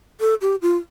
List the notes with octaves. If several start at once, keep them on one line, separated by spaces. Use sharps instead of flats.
A4
G4
F4